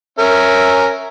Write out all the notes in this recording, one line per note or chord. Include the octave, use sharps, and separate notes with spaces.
C#4 A#4 E5